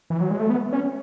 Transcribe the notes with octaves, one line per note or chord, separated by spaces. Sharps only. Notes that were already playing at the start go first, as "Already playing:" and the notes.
E3
F#3
G#3
A3
B3
C#4